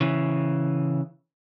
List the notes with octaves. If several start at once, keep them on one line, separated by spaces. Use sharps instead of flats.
C#3 E3